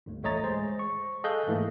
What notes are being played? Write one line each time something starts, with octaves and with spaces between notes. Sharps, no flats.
G1 D2
A1 A3 C#5 D#5 A#5 A6
G#3 G#4 C5
C#6
G#4 A4 D#5 F5 F#6 G6
G#2 E3 A3 A#3